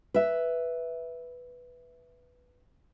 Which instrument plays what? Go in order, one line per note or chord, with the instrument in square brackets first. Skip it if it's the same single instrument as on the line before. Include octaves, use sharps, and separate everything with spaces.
[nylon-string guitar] B4 E5